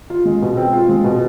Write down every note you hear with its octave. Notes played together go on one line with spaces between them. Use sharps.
F4
G#3
B2
C4
F4
G#3
B2